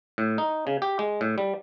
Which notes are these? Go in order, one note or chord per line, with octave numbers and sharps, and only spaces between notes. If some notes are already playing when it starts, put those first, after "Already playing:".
A2
D#4
C#3
G4
G#3
A2
G3